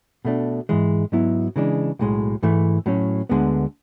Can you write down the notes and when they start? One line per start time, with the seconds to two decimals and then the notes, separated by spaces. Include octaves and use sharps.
0.25 B2 A3 D4
0.69 G#2 E3 G#3
1.12 G#2 F#3 B3 E4
1.56 C#3 E3 G#3 D4
1.99 B1 A2 G#3
2.43 G#2 E3 A3
2.86 A2 F#3 C#4
3.29 D2 D3 G#3 B3